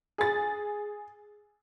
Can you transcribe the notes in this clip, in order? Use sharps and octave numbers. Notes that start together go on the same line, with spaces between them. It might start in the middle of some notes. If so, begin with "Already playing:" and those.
G#4 A6